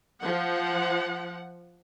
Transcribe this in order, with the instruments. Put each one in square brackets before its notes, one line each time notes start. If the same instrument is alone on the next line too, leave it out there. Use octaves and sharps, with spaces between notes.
[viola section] F3 F#5